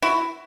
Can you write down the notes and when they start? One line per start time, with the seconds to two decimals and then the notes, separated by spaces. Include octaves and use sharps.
0.02 E4 F#4